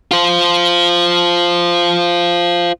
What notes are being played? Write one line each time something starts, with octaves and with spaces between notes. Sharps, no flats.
F4 C5